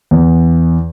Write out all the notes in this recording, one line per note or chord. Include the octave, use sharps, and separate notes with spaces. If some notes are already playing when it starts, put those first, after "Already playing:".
E2